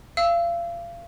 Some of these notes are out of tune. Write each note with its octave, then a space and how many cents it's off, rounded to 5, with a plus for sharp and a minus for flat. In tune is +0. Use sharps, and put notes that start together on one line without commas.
F5 -35 E6 -10